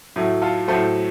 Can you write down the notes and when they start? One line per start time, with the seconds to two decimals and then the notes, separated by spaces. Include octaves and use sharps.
0.16 A2 F#3 A3
0.42 F4 A4
0.68 A2 F#3 A3 A4 C5